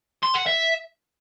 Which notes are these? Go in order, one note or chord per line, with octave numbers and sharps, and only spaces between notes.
C6
F#5
E5